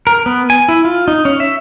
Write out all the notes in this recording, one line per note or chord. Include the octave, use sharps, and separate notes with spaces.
A#4
B3
G#5
E4
F4
D#4
C#4
E5